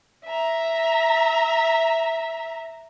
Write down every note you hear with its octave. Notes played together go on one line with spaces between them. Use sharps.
E5 A#5